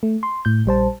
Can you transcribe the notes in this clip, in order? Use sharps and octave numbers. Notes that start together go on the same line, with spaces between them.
A3
C6
A2 G6
A#1 G3 C5 A5